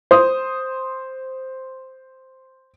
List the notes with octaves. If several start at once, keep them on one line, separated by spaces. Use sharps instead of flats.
C5 D#6